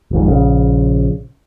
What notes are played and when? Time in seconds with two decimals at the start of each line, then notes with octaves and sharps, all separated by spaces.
0.11 D#1 A#1 G#2
0.28 A#1 C#3